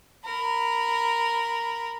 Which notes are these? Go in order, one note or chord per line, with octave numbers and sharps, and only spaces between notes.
A#4 B5